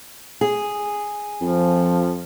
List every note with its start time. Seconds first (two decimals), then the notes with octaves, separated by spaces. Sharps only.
0.41 G#4
1.41 F2 F3